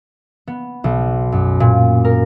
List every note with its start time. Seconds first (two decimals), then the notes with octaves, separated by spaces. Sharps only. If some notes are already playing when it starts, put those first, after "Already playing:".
0.47 B3
0.84 B1
1.32 F#2
1.60 A#2
2.05 A#4